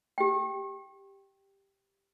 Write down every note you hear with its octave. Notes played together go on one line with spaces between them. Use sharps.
G4 G5